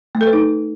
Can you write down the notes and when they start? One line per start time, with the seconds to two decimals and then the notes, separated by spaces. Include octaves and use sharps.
0.15 A3
0.21 A4
0.27 B4
0.33 D#4